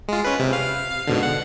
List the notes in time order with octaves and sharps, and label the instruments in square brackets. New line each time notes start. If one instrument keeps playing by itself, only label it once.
[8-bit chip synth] G#3 F4
C#4 B4
C3
F5
G#2 B2 D3
F#5